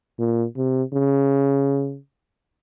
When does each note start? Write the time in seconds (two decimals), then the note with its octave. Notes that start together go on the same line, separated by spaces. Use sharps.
0.19 A#2
0.57 C3
0.94 C#3